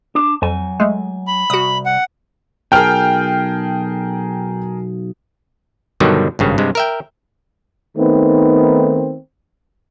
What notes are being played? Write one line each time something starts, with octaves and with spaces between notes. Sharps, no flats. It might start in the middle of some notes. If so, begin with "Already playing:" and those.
D4
F2 F#3 G#5
G#3 A3
B5
C2 F#4 D#6
F#5
B1 G#4 A#4 G5 A5 F6
G2 B2 D3 D#3 F#3 G3
G#1 G2 C#3
G2 C3 G#3
A#4 E5 G5
D#3 A3 B3 C4 D#4